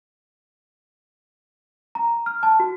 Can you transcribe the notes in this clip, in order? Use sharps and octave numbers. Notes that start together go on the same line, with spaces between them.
A#5
F6
A5
F#4